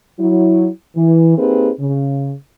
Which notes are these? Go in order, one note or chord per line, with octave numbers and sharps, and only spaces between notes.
F#3 E4
E3
A#3 C4 D#4 G4 G#4 B4
C#3